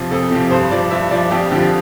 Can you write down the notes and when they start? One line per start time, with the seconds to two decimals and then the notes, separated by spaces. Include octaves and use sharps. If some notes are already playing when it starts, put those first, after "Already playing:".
Already playing: F2 C3 F3
0.11 F2 A4
0.31 C3 F3 G4
0.51 G2 C5
0.71 F3 D5
0.91 G2 E5
1.11 F3 D5
1.31 F2 G4
1.51 D3 G4
1.55 F3